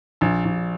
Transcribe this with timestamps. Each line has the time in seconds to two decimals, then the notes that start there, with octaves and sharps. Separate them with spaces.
0.21 A#1
0.45 A#1